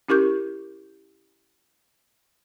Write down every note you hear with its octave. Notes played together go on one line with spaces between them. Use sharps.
C#4 E4 G4 A#4 C#6 G6